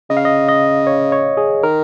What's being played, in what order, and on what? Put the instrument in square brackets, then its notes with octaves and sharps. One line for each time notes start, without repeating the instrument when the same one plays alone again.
[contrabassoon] C#3 [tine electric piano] D#5
[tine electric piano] F5
D#5
D#5
C#5
C#5
G#4
[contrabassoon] D#3 [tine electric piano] A#4